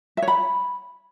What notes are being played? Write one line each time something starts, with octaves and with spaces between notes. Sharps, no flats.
E5
C#5
B5